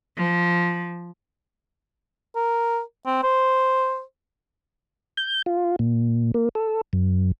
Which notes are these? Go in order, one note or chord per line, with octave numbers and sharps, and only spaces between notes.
F3
A#4
C4
C5
G6
F4
A#2
A#3
A4
F#2